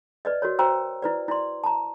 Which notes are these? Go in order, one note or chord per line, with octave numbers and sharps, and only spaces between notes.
B4 D5 D#5
F#4 A#4 C#5
F#4 C5 G5 A#5 E6
E4 B4 D5
E4 D5 C6
A5 A#5